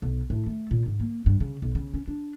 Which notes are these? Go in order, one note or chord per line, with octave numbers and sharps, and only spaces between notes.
B1
A2
A3
A#2
G#2
A#3
G2
C#3
B1
C#3
C#4
D4